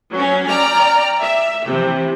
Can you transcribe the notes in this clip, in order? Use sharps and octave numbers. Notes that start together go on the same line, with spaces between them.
F#3 C#4
D5 G5 A#5 F6
E5
C3 E3